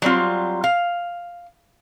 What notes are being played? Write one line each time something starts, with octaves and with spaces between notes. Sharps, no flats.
F#3 G3 C4 F4
F5